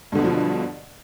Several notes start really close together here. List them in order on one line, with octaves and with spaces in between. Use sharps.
G2 D3 B2 F#3 F3